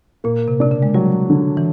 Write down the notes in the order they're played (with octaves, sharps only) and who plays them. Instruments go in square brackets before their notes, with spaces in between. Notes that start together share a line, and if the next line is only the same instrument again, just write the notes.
[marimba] A#2 [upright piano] A#3
[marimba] C3
[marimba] C3 [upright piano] D4
[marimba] C#3
G#3
[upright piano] F#3 [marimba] G3
[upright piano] D3
[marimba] E3